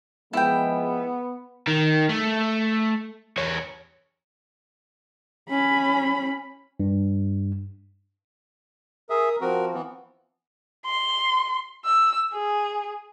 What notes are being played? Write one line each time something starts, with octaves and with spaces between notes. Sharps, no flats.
F3 G#3 B3 E4 G5
D#3
A3
E2 C#5
C#4 B5
G2
G#4 A#4 E5 D#6
F3 C4 F#4 A#4
E3 B3
C6
E6
G#4